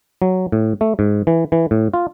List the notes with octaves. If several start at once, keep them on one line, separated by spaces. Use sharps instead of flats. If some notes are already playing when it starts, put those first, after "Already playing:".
F#3
A2
A3
G#2
E3
E3
A2
F4